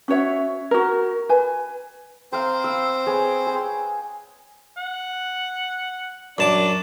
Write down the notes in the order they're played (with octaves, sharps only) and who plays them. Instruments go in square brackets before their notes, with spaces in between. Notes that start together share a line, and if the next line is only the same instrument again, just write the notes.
[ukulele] C#4 F#4 C#5 E5
F#4 A#4
B4 G#5
[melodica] C4 C5 [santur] A#4 F5
[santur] F5 B5 E6
G#4 B4 C#5
G#4
[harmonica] F#5
[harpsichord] F#2 A5 D6 [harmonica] D4 D5